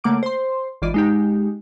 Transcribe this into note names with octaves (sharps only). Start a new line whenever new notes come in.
C#3 A3 A#3 F#5 D6 D7
C5 C6
G#1 D#3 E3 F4 D5 D#7
G#3 D#4 G4